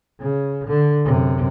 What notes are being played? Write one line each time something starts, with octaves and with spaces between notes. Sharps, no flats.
C#3
D3
F#2 C3